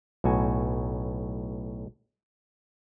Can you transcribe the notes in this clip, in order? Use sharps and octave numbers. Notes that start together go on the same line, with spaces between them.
B1 A2 F#4 G#5